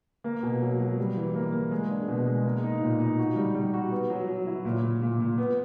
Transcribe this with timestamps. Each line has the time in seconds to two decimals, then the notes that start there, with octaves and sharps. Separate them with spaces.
0.24 A#3
0.43 B2
0.62 F#3
0.80 F#3
0.98 G3
1.16 E3
1.35 A#3
1.53 A#3
1.71 G#3
1.90 D4
2.08 B2
2.27 G#3
2.45 A#3
2.64 D#4
2.82 A#2
3.00 D#4
3.18 F#4
3.36 G3
3.55 G3
3.74 F#4
3.91 B3
4.10 F#3
4.28 F#3
4.47 E4
4.65 A#2
4.83 A#2
5.02 A#2
5.20 A#2
5.38 B3